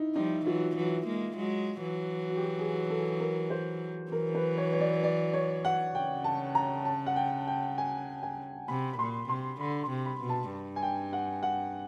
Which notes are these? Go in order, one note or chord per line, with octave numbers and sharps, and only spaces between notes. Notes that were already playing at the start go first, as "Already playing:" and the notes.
Already playing: D#4 E4
F3 G3 D#4
E3 F#3 F4
E3 F#3
G#3 A#3
F#3 G#3
E3 F#3
F#4
G4
F#4
G#4
A4
A#4
C5
E3 F#3 A#4
B4
C#5
C#5
D5
D5
C#5
F#5
C#3 G5
A5
A#5
A5
F#5
G5
G5
G#5
G#5
C3 B5
B5
A#2 C6
C3 C6
D3 B5
C6
C3
B5
B2
A5
G2
G#5
G5
F#5
F#5